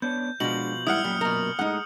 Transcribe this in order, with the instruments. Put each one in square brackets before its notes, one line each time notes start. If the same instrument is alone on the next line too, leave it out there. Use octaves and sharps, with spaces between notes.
[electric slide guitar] B3 D4 C#5 [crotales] G6
[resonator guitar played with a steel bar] B2 F3 [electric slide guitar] G#3 D4 F#4 [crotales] F#7
[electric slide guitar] G#2 E3 G3 [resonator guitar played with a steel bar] E4 F#5 [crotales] D#6 F6 C#7
[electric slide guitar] F#2 A#2 [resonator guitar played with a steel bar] G3
[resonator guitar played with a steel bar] B2 A#4
[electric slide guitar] A2 G#3 [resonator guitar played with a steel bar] D#4 F#5